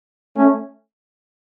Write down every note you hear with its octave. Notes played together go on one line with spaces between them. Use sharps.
A3 C#4